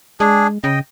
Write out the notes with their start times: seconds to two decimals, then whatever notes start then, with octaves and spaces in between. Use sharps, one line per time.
0.20 G#3 D4 G#4
0.64 C#3 D#5 G5